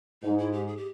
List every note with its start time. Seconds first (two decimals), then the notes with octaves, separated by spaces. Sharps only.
0.22 G#2 D#4
0.38 E4
0.52 G4
0.67 G#4
0.77 G4